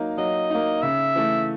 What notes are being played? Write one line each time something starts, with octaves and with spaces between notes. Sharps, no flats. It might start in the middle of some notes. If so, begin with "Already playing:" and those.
Already playing: F#3 A#3 D#4
F#3 D#5
A#3 D#4
C#3 E5
E3 A3